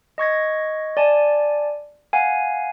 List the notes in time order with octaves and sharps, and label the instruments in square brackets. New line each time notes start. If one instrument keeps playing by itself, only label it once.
[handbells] D#5 C#6 G#6 A#6
D5 G#5 A5
F5 F#5 G#5